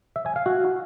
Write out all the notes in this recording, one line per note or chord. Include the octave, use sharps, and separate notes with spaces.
E5
G#5
F5
F#4